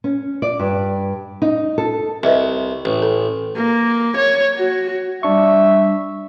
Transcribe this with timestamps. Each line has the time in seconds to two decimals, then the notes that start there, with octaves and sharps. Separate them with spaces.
0.04 C#4
0.42 D5
0.59 G2
1.42 D#4
1.78 A4
2.23 C2 B4 D#5 E5
2.85 A1
3.02 A4
3.56 A#3
4.16 C#5
4.58 F#4
5.23 G3 D4 E5 C#6